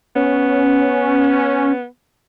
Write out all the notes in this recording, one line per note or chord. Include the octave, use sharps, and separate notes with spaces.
B3 C#4